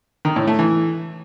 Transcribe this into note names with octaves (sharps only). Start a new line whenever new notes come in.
D#3
A2
A3
E3